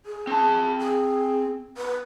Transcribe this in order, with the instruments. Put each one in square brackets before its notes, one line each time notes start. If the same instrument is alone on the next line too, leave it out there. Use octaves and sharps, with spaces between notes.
[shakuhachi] G#4
[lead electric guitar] C4 A5
[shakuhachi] G#4
B4